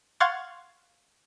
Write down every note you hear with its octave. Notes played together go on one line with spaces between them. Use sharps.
F5 F#5 C6 C#6 G#6 A6